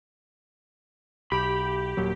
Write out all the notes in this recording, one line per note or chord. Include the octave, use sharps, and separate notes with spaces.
B1 G4 B5
D#1 A#2 F#3